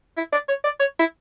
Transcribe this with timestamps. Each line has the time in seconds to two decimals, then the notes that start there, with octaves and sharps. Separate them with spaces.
0.17 E4
0.32 D5
0.48 C#5
0.64 D5
0.79 C#5
0.99 E4